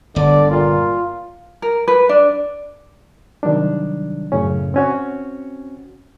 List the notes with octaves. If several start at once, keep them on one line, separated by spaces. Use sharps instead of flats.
G1 D3 D5
A#2 F4
A#4
B4
D4
C3 D#3 F#3 G3 D4
F#2 A2 C#3 C#4
C4 C#4 F#4